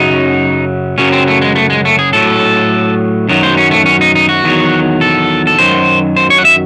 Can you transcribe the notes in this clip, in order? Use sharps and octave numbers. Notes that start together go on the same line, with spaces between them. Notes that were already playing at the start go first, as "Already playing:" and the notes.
Already playing: F#2 C#3 F#3 D#4
F#2 C#3 F#3 C#4
C4
A3
G#3
A3
G#3
A3
G#4
A2 F#3 A4
F#2 D#3 F#3
C5
C#4
A3
C#4
D#4
D#4
F#4
E2 D#3 F#3
A4
A4
F#2 D#3 F#3 C5
C5
C#5
F#5
E5